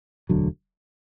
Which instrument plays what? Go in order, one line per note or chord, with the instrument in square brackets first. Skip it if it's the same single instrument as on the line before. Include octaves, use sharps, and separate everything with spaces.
[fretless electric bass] E1 D2 D3 F#3